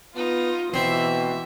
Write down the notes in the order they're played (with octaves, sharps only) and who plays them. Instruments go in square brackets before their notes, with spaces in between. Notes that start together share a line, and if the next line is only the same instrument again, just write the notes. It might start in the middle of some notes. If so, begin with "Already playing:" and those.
[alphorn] B3 [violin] D#4 [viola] F4
[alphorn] B2 [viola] E3 [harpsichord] C4 [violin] E5